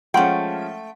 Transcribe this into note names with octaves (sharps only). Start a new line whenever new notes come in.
F3 G#3 A3 C#4 F#5 G5 C6